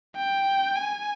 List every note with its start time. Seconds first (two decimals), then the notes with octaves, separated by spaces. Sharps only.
0.16 G5
0.75 G#5